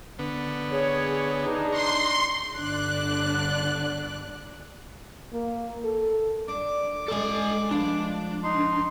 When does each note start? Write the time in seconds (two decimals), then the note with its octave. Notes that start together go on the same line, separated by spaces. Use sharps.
0.19 D3 B3
0.71 G#4 C#5
1.44 D4 D#4
1.72 A#5 C6 C#6
2.54 G1 D3 D4 D5 F#6
5.33 A#3
5.85 A4
6.48 D4 D6
7.08 D3 G#3 A4 D#5 G#5
7.71 F3 G#3 D4 B4
8.43 D#4 C6